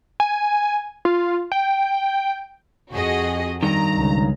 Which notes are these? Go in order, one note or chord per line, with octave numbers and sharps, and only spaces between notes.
G#5
F4
G5
F2 F#4 G#4 D#5
G2 D#3 A#5
C#2 C#3